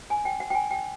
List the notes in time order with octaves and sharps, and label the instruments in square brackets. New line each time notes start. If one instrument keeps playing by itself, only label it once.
[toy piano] G#5
G5
F#5
G5
G#5
G5